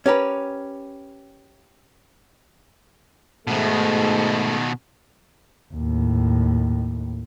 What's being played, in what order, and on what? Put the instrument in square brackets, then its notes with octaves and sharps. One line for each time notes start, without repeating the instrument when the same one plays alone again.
[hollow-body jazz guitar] C#4 G4 A#4 B4
[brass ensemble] G#2 A3 [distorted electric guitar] B2 D#3
[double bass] D#2 A2